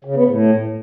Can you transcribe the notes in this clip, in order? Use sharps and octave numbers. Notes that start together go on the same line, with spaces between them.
C#3
B3
A2